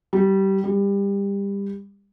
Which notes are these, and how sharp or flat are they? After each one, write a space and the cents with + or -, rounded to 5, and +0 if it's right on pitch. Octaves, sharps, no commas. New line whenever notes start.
G3 -20
G3 +25